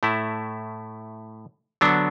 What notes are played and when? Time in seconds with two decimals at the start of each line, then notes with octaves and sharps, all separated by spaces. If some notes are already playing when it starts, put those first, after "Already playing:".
0.03 A2 A3 E4
1.81 D3 F#3 B3 D4